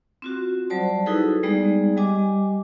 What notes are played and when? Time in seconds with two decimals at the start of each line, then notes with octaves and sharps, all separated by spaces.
0.22 C4 F4 F#4
0.70 F#3 G3 C5 D5 A5
1.06 D#4 E4 F#4 G#4 A4 B4
1.43 G3 G#3 B3 D#4 G#4 D5
1.97 G3 G4 D#5 G#5 D6